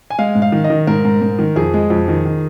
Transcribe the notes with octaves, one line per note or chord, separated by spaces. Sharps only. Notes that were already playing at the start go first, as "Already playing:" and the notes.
G#5
G#3 F5
G#2
F5
D#3
D#5
D#3
G#2 A#4
G#2
G#2
D#3
F2 G#4
G#3
F2
D#3
D#3